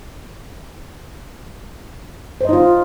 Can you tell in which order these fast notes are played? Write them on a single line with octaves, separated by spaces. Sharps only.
C5 D#5 D#4 F4